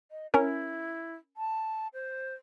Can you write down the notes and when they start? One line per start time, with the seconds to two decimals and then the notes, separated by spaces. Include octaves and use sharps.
0.11 D#5
0.34 C#4 E4 A#4
1.37 A5
1.94 C5